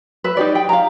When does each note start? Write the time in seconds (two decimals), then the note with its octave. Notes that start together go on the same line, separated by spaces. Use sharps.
0.24 B4 E5
0.37 D#4 G4 D5
0.55 G5
0.69 F5 A#5